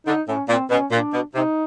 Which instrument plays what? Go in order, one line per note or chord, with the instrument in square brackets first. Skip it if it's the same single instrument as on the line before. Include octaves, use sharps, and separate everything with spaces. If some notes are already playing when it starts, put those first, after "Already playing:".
[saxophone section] D3 [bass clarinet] D#4
[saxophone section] A2 [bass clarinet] C#4
[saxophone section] A#2 [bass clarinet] C4
[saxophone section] B2 [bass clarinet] C#4
[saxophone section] A#2 [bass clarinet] D4
[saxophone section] B2
[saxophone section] C3 [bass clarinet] D#4